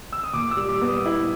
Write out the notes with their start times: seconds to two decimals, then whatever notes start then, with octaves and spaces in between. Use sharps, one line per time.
0.12 E6
0.23 D#6
0.34 A#2 D6
0.51 E6
0.57 G3
0.69 D6
0.81 B3
0.88 D#6
1.05 E4